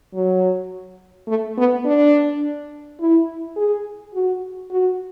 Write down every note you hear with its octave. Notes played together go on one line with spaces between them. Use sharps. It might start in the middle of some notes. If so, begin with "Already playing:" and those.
F#3
A3
B3
D4
E4
G#4
F#4
F#4